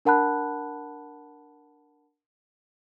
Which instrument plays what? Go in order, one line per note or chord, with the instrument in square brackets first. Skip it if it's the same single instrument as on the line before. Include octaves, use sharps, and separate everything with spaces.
[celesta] D4 A#4 F#5 A5 B5 F#6